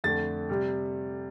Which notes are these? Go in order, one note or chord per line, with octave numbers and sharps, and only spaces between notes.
F2 D3 A3 A6
C3 G3